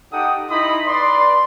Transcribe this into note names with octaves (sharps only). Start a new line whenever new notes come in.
D#4 G4 A4 F#5 G5 D#6
D#4 E4 D#5 B5 C6 D#6
B4 D5 C6